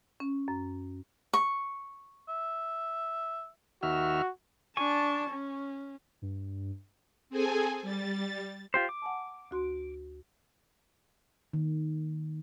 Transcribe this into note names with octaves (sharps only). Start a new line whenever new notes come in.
C#4
F#2
C#6
E5
D#2 F#4 E5 F6
D4 G#5 A5 C#6
C#4
G2
C4 G#4 A4 G#5
G3 A6
F4 G4 C5
D6
F#5 G#5 A5
D2 F#4 C6
D#3